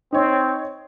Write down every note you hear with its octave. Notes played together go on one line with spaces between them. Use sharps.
C4 D#4 C#5